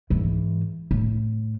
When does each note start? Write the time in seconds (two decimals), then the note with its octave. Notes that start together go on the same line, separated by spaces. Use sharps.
0.10 G#2 E3
0.91 A2